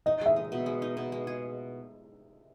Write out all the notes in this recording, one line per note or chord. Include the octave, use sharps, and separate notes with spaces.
D#4 D#5
G#3 E5
D#4
B2
G#3
D#4
B2
G#3
G#4